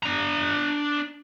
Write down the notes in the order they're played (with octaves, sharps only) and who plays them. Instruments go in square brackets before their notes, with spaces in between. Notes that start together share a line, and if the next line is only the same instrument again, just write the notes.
[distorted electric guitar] D4 A#5